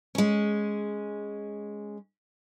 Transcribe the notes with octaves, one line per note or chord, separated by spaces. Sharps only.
G#3 C#4